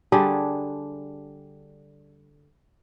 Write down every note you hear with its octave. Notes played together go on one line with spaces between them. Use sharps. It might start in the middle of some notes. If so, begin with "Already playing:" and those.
D3 G3 D4 G#4